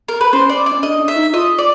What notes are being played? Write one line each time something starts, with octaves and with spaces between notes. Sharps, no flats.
A#4
B4
C#4 C5
D5
D5
C#4
D4 D#5
D4
E5
D#4
F4 D#5
D5